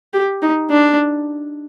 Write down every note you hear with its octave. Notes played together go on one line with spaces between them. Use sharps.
G4
D#4
D4